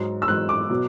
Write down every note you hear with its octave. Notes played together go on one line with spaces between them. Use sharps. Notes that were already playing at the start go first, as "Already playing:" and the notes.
Already playing: G#2 F#3
E6
G#2 F#3 F#6
D6
B2 F#3